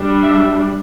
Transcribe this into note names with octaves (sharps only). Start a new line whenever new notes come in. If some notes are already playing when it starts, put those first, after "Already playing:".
Already playing: G3 D4
E5